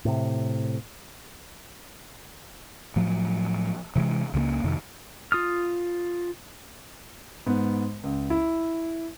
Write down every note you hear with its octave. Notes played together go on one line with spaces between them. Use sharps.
A2 C3
A2 F3 F#3
C3 E3 F3 G#3
C#2 C#3 G3 A#3
F2 C3 D#3
F4 D#6 F6
G#2 B3
C#2
E4